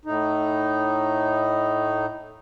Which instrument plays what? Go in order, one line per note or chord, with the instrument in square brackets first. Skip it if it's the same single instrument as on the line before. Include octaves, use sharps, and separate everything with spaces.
[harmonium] A2 D#4